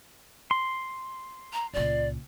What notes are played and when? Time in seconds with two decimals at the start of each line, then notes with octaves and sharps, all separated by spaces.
0.51 C6
1.53 A#5
1.73 C#2 A#2 D5